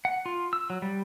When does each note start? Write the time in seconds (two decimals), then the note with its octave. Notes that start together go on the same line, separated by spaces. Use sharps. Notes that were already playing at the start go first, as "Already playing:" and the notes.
0.05 F#5
0.26 F4
0.53 E6
0.70 F#3
0.82 G3